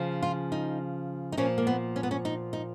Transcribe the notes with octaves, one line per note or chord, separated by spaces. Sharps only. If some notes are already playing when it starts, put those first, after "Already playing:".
Already playing: C#3 F3
F4
D#4
D#4
A#2 F3 C#4
A#3
B3
C#4
B3
C#4
D#4
D#4